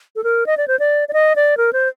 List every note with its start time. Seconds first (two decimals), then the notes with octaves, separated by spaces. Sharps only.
0.16 A4
0.24 A#4
0.46 D#5
0.57 D5
0.68 C5
0.79 D5
1.08 D5
1.13 D#5
1.36 D5
1.57 A#4
1.73 C5